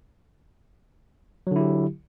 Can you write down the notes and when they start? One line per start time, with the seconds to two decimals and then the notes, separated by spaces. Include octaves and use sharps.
1.47 F#3
1.51 D3
1.56 E4
1.61 G4